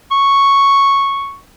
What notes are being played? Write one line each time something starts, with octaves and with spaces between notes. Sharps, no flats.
C#6